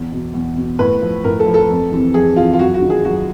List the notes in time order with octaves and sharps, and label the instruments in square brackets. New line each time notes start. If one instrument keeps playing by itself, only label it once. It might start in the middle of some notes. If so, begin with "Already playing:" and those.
Already playing: [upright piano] E2
B2
E2
B2
A2 B4
F3
A2 A#4
A4
F3
A4
F2
C3 E3
F2 G#4
C3 E3 F4
F4
F#2 F#4
F#4
D#3
G#4
F#2 F#4